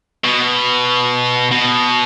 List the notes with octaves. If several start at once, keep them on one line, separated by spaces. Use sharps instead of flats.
B2
B2